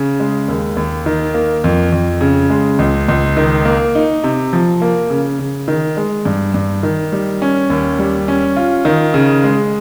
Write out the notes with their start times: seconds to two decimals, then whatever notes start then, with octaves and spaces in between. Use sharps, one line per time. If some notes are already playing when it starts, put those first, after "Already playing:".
Already playing: C#3
0.20 G#3
0.48 D#2
0.77 D#2
1.06 D#3
1.34 A#3
1.64 F2
1.92 F2
2.21 C#3
2.50 G#3
2.79 C#2
3.08 C#2
3.37 D#3
3.65 A#3
3.95 D#4
4.23 C3
4.53 F3
4.82 A#3
5.10 C#3
5.39 C#3
5.68 D#3
5.97 G#3
6.25 G2
6.54 G2
6.83 D#3
7.12 G3
7.42 C#4
7.70 D#2
7.99 G3
8.28 C#4
8.56 F4
8.85 D#3
9.14 C#3
9.44 G#3